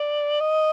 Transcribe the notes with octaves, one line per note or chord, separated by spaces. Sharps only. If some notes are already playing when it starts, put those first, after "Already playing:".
Already playing: D5
D#5